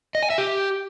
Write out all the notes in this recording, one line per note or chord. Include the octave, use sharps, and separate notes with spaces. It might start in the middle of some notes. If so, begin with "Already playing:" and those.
D#5
G#5
E5
G4